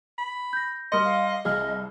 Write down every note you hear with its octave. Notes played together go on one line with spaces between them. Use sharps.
B5
G6 A#6
G3 A#4 D#5 C6 D#6 F6 C#7
F5
C2 G#4 D#5 F5 F6